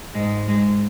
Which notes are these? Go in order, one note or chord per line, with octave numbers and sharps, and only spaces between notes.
G#2 G#3
G#2 G#3